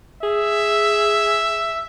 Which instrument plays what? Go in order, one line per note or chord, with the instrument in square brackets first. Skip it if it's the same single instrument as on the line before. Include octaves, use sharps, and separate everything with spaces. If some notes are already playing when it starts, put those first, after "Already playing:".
[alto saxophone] G#4 [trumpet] E5